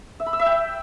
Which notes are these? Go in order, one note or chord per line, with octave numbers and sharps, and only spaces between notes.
E5
B5
E6
E5
G5